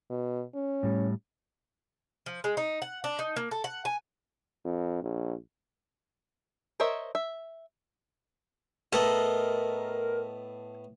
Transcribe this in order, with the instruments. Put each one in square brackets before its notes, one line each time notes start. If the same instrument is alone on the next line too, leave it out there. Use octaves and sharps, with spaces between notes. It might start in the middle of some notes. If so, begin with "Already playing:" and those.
[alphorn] B2
C#4
[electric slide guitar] A2 G3
[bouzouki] F3
G#3
D#4
F#5
D4
D#4
A#3
A4
F#5
G#5
[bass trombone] F2
A#1
[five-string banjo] A#4 C5 C#5 D#5 E5
E5
[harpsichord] A2 B3 [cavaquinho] A4 D#5 [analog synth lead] A#4